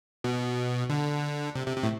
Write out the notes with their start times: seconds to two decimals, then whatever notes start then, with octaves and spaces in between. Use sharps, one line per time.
0.24 B2
0.90 D3
1.55 C3
1.67 C3
1.77 C3
1.83 A2